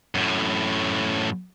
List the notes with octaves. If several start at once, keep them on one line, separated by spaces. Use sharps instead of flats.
F#2 A2